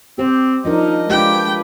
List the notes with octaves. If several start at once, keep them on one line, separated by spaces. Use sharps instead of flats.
C4 G4 C5
F3 D4 D#4 A#4 D#5
G#3 D4 F4 G4 B4 G5